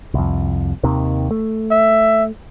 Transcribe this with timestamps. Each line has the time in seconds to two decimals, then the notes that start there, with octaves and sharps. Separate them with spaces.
0.14 C2 F2
0.84 D#2 C3 D#3
1.31 A3
1.71 E5